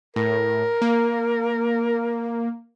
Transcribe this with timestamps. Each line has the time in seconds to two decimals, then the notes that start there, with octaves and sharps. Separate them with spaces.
0.16 A2 A#4
0.82 A#3